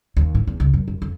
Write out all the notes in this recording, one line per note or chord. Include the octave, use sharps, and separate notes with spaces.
D#2
A2
E2
C#2
F#2
F#2
F2